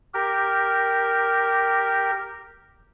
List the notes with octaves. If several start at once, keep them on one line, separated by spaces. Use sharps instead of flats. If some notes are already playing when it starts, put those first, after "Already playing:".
G4 A#4